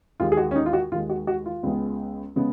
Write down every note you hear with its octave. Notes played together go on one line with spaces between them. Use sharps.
D#2 D#3 G#3 F4
G#4
F#4
C#4
D#4
F4
F#4
D#2 D#3 G#3 F4
F#4
F#4
F4
C#2 C#3 G#3 B3
C#3 G#3 B3